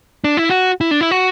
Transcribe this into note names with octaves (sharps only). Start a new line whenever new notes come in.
D4
E4
F#4
E4
D4
E4
F#4